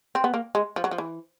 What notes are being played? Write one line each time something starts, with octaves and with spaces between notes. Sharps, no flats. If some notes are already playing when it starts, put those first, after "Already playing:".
C4
B3
A#3
G#3
F3
F#3
F3
E3